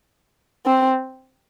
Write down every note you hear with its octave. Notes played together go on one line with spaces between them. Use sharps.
C4